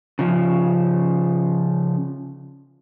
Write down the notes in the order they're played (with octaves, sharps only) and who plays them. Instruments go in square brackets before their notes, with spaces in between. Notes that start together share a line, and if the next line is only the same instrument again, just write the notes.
[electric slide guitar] C#3 F3